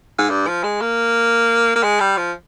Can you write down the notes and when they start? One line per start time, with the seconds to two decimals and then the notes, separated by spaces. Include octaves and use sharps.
0.18 G#2
0.29 G2
0.47 F3
0.63 G#3
0.81 A#3
1.76 A#3
1.83 G#3
2.00 G3
2.17 F3